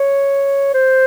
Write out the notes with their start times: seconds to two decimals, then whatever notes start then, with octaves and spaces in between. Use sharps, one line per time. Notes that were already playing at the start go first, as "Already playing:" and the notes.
Already playing: C#5
0.74 C5